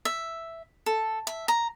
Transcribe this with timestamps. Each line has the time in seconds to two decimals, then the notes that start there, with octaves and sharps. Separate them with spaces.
0.05 E5
0.86 A4
1.27 E5
1.48 A#5